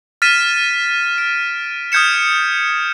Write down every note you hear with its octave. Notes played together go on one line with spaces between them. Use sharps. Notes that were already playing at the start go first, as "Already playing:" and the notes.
F6 A6 B6 D#7 E7
D7
D#6 F6 G6 G#6 C#7 E7